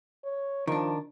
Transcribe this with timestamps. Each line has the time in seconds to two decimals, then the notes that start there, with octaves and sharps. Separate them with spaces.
0.24 C#5
0.68 D#3 F3 D4